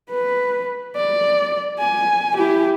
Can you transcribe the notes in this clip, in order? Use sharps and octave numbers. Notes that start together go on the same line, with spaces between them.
B4
D5
G#5
E4 G4